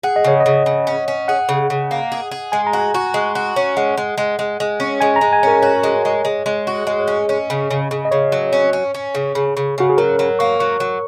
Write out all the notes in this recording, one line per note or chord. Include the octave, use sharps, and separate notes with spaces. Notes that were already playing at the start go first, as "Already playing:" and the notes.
G#4 F#5
D#5
C#3 C#5
D#5
C#3
C#3
C#4
C#4
G#4 F#5
C#3
C#3
A#3
G#4
G#4
G#3 G#5
A#5
F#4
G#5
F#4
G#3
F#4
C#4
G#3 F#5
G#3
G#3
G#3
G#3
C#4
G#3 G#5
A#5
G#3
G#5
C#4 A#4
F#4 C#5
G#3
G#3
G#3
G#3
F#4
G#3 D#5
C#5
C#4 D#5
C#4
C#3
C#3
C#3
D#5
C#3 C#5
F#3
C#4
C#4
C#4
C#3
C#3
C#3
C#3 F#4
G#4
F#3 A#4
F#3 C#5
A#3 C#6
F#3 C#6
F#3